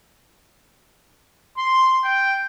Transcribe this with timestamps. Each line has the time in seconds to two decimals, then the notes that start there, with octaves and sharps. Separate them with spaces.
1.58 C6
2.04 G5